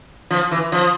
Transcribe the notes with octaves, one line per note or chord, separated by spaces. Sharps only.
F3
E3
F3